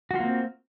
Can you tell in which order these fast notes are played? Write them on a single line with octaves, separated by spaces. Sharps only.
F#4 F4 A#3 C4